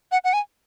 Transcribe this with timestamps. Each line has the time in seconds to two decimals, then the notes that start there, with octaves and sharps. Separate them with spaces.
0.12 F#5
0.24 F#5
0.33 G#5